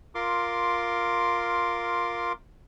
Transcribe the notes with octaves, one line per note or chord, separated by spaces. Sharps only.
F4 A#4 C6 D6